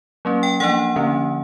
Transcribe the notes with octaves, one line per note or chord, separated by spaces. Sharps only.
F#3 A#3 C#4
G5
F3 A#3 D4 F#5
D3 F3 A#3 C#4